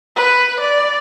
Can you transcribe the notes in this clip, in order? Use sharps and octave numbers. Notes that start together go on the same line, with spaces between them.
B4
D5